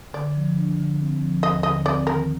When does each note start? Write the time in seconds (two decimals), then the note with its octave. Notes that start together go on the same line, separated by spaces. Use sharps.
0.13 D3 D5
0.35 F3
0.57 D4
0.78 D3
0.99 C4
1.21 F3
1.43 D#2 D#5
1.63 D3 D#5
1.85 C4 D5
2.07 D#3 A#4